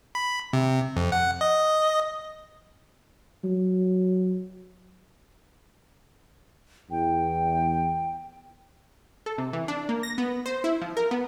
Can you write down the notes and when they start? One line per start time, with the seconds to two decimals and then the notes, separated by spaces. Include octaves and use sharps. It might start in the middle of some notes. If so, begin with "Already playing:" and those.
0.15 B5
0.53 C3
0.96 F2
1.12 F#5
1.41 D#5
3.44 F#3
6.91 E2 G5
9.26 A4
9.38 C3
9.53 E3
9.68 D4
9.89 A#3
10.03 A#6
10.18 B3
10.46 C5
10.64 E4
10.82 F3
10.97 A#4
11.11 B3